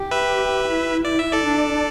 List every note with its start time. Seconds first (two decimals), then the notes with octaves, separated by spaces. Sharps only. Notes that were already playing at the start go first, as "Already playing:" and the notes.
Already playing: G4
0.11 B4 E5
0.68 E4
1.05 D5
1.19 E5
1.33 A4 D5
1.43 D4